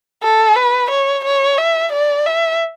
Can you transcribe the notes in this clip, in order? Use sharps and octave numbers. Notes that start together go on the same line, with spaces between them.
A4
B4
C#5
C#5
E5
D5
E5